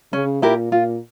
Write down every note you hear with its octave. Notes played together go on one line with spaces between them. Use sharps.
C#3 C#4
A#2 E4 G4 A#4
A#2 F4